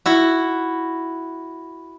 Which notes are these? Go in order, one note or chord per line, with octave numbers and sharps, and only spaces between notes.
E4 F#4